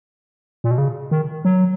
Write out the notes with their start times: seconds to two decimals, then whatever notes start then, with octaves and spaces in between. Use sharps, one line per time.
0.64 A#2
0.71 B2
0.78 C#3
1.11 D#3
1.45 F#3